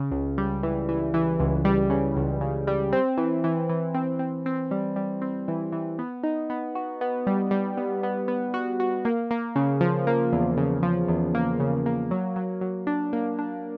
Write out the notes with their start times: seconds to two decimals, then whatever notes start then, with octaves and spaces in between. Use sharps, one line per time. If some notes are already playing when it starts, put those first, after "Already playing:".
Already playing: C#3
0.11 C#2
0.38 G3
0.63 E3
0.89 E3
1.14 E3
1.40 C#2
1.65 G3
1.90 C#3
2.16 C#2
2.41 C#3
2.67 G3
2.93 C4
3.18 E3
3.44 E3
3.70 E3
3.95 C4
4.19 C4
4.46 C4
4.71 G3
4.96 G3
5.22 C4
5.48 E3
5.72 E3
5.99 B3
6.23 D#4
6.50 B3
6.75 F#4
7.01 B3
7.27 G3
7.51 G3
7.77 B3
8.03 B3
8.28 B3
8.54 F#4
8.80 F#4
9.05 A#3
9.31 A#3
9.56 C#3
9.81 F3
10.07 A#3
10.33 E2
10.57 C#3
10.83 F3
11.08 E2
11.35 A#3
11.60 C#3
11.86 A#3
12.11 F#3
12.36 F#3
12.61 F#3
12.87 D4
13.13 A#3
13.39 D4